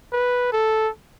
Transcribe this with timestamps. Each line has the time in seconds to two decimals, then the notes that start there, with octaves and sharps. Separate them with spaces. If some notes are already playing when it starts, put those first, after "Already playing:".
0.12 B4
0.52 A4